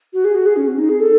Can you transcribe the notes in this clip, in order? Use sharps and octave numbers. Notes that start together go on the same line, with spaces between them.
F#4
G#4
F#4
G#4
C#4
C4
D#4
G#4
A4